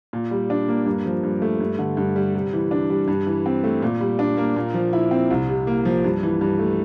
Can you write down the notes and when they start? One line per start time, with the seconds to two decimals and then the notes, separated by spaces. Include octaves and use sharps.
0.13 A#2
0.31 G3
0.50 D4
0.68 A#3
0.86 G2
1.06 F3
1.23 G2
1.42 A3
1.60 G2
1.79 D3
1.97 G2
2.16 G3
2.34 C3
2.53 E3
2.71 D4
2.90 G3
3.08 G2
3.27 E3
3.46 C4
3.64 A3
3.82 A#2
4.01 G3
4.19 D4
4.37 A#3
4.56 A#2
4.74 F3
4.93 E4
5.11 C4
5.30 C2
5.49 C3
5.67 A#3
5.85 F3
6.04 G2
6.23 E3
6.41 G2
6.59 A3